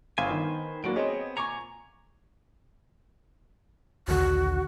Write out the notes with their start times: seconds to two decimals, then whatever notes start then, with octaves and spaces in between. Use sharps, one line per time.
0.18 G1 B4 C5 F5 G#5
0.31 D#3
0.84 A2 F#3 A#3 D4 F#4 D7
0.96 B3 C4 G#4 C#5 D#5
1.37 A#2 G#5 A#5 C#6 D6 C#7
4.08 A#1 D#2 D3 F#4